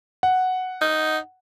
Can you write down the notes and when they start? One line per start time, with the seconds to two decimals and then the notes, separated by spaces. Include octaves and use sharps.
0.23 F#5
0.81 D#4